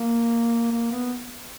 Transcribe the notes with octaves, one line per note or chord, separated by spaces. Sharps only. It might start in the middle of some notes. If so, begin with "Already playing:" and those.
Already playing: A#3
A#3
B3